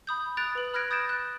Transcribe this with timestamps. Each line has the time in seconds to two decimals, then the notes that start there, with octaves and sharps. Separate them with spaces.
0.07 B5 D#6 G6
0.37 D#6 F#6 A6 D7 F7
0.55 B4 F#7
0.74 B5 F6 F#6 G#6 A#6 D7
0.91 D#6 G6 A6 A#6 D7 E7
1.09 F#6 A6